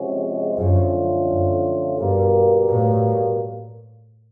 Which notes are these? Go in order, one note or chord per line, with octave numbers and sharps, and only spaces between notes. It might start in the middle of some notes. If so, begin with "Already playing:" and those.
Already playing: C3 F3 G#3 C#4 F#4
F#2 D3 F3 A3 C#4 F4
F#2
G2 B2 G3 A#3
A2